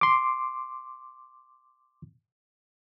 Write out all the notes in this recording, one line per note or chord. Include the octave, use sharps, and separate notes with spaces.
C6 D6